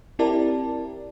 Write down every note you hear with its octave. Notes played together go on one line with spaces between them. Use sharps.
C4 E4 G4 A#4 D5 A5